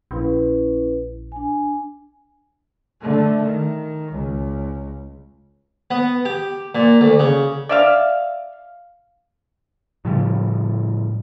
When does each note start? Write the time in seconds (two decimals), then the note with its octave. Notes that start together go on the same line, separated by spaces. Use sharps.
0.11 A#1 C#4 E4 B4
1.32 D4 G#5
3.01 D3 A3
3.42 D#3
4.11 C#2
5.91 B3
6.25 G4
6.75 A#2
7.01 D2
7.19 C#3
7.69 D5 E5 F5
10.05 A2 C#3 F3 G3